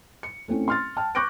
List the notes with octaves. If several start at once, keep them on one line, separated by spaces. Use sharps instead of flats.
C#7
A3 C4 C#4 E4
C6 F6 A6
G5 A5 F6
C#6 D6 F#6 G6 A#6 D7